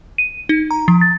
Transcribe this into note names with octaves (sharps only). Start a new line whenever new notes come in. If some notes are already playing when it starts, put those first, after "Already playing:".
D#7
D#4
A#5
F3
A6